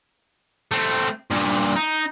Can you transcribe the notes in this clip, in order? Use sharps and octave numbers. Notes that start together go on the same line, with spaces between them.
A3 C4
G2 A#2
D#4